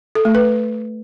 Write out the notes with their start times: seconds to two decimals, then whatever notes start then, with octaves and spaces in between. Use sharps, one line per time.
0.15 A4
0.25 A3
0.35 B4